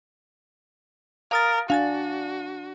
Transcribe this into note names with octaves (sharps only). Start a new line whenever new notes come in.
A#4 F5 D#6 A6
D4 F#4 F5 G#5 A6